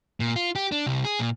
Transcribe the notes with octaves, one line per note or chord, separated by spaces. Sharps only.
A#2
F4
G4
D4
C2
G#4
A#2